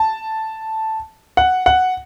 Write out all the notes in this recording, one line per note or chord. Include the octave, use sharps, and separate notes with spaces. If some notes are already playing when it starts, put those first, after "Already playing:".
Already playing: A5
F#5
F#5